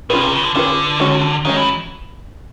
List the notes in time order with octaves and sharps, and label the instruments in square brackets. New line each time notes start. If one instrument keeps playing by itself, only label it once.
[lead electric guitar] B2 [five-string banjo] C#4 F4 G#4 B4
[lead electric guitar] C3
C#3
D3
[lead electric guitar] D3 [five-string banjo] C#4 F4 G#4 B4
[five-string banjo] G#3 C#4 F#4
[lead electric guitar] D#3 [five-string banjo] G#3 C#4 F#4
[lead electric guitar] E3